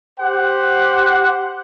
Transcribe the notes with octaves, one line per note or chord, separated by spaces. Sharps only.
G4 C5 F#5